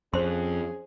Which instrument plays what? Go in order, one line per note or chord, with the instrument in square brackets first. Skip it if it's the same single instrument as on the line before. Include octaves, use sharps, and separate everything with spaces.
[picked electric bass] F2 [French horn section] C#4 G#4 [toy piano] C5 C6